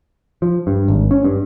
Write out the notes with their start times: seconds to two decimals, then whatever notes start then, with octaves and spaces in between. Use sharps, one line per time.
0.42 F3
0.67 G2
0.88 G#1
1.11 C#4
1.24 G2